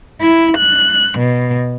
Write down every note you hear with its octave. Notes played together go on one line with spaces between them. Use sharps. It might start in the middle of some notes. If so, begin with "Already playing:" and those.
E4
F#6
B2